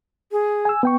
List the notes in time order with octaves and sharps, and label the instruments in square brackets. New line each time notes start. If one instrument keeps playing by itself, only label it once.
[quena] G#4
[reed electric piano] G#5 E6
B3 G5 C#6